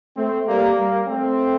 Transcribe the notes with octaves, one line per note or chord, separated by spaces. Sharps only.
A3 C4
G3 A#3
G3 A#3
A3 C4